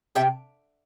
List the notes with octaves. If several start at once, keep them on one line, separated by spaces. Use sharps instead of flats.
C3 E5 G5